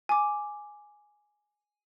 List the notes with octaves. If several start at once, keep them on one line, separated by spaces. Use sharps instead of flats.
G#5 D6